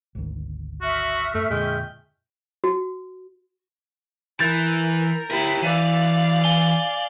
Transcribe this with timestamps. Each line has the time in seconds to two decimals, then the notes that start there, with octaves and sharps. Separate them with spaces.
0.15 G#1 D2 D#3
0.81 F#4 E5 C#6 F6
1.35 F#2 A3
1.50 F2 A#2 D3 G#3 G5
2.64 F#4
4.40 E3 A#4 G6 A6
5.31 E4 G4 A#4
5.63 E3 D5 F5
6.44 G#5 G7